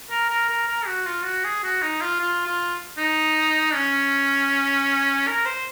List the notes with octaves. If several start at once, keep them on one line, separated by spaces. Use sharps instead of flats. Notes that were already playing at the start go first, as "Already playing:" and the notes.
A#4
A#4
A#4
A#4
F#4
F4
F#4
G#4
F#4
D#4
F4
F4
F4
D#4
C#4
A#4
C5